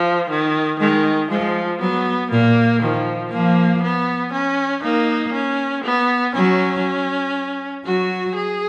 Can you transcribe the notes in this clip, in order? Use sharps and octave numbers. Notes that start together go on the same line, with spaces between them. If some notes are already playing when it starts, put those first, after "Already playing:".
Already playing: F3
D#3
D#3 G#3
F3 G#3
F#3 B3
A#2 A#3
D#3 F3
F3 A#3
B3
C#4
A#3 D#4
C#4
B3
F#3 C#4
F#3 F#4
G#4